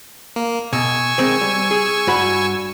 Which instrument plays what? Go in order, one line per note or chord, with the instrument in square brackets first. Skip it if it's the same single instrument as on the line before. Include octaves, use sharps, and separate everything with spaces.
[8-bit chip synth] A#3
[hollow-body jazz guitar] B2 [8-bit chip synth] G#5 C#6 E6
[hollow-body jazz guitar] D#3 G#3 C4
G3
G#4
G2 F#4 B5